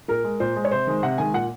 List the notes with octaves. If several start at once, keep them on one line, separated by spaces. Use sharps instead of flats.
A#2 A#4
G#3
A#2 C5
G#3
C#5
C3 C5
D#3 G#3
C3 F#5
D#3 G#3 G#5
A#2 F#5